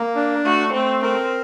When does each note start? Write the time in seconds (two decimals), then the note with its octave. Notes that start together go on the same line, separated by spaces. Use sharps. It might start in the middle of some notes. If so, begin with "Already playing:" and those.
Already playing: A#3
0.15 D4
0.44 A3 F#4
0.73 A3 C4
1.02 C4 A#4